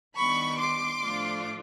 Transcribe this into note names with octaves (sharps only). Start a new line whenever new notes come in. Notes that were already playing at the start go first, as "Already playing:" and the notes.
D#3 G3 B3 D4 B5 C#6
C6 D6
A2 F3 A3 D4 F4